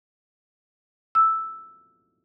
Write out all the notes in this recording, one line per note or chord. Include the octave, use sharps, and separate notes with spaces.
E6